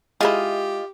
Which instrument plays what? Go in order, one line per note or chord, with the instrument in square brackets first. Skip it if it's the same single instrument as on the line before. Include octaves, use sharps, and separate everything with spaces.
[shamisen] G#3 E4 [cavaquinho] F4 D#5 [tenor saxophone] G4